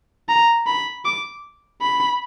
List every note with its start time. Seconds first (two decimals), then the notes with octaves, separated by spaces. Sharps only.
0.29 A#5
0.67 B5
1.05 D6
1.81 B5